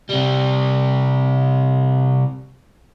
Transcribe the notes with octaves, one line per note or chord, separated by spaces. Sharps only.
C3 G3